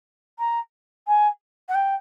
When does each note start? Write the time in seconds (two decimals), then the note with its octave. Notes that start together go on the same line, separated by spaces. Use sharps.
0.39 A#5
1.07 G#5
1.69 F#5
1.74 G5